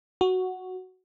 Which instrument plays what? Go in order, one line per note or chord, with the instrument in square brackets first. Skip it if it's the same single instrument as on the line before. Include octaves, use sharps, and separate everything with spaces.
[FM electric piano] F#4